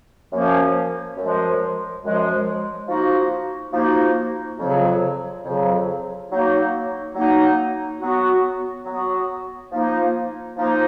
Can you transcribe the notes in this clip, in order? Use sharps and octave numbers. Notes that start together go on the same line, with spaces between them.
F#2 F3 A#3 C#4
F#2 F3 G#3
F#2 F3 G#3
F3 A#3 D#4 F#4
F3 A#3 D#4 F#4
F2 C#3 F#3
F2 C#3 F#3
F#3 A#3 D#4 F#4
F#3 A#3 D#4 F#4
F#3 B3 F#4
F#3 B3 F#4
F3 A#3 D#4
F3 A#3 D#4